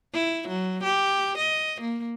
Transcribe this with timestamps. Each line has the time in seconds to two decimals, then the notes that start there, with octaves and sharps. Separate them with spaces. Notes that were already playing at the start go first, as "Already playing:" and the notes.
0.13 E4
0.48 F#3
0.83 G4
1.37 D#5
1.81 A#3